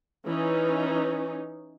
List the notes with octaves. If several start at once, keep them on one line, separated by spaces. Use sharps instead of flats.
E3 C#4 D#4